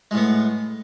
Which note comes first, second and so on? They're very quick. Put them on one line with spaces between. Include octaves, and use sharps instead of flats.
G#3 A2 B3